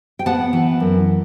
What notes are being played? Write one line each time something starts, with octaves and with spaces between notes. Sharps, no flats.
G5
B3 F#5 A5
E3
F#2